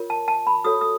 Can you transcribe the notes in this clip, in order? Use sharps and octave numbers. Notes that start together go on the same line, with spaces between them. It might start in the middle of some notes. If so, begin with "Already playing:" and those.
Already playing: F4 A#4 C#5
A5
A5
B5
F#4 A4 C#5 D#6
D#6